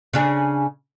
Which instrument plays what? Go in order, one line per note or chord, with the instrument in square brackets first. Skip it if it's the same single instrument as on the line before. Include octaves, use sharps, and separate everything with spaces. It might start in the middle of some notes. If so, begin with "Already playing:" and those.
[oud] C#3 D4 G#4